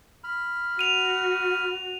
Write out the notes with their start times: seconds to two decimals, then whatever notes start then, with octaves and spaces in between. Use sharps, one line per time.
0.24 B5 F6
0.79 F#4 D#7 F7